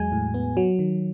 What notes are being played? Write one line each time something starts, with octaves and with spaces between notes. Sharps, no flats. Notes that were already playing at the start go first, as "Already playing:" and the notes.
Already playing: E2 F#3 G#3 G#5
A2
B3
F#3
D#3